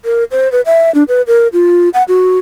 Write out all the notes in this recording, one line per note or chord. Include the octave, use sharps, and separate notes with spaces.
A#4
C5
B4
E5
D4
B4
A#4
F4
F#5
F#4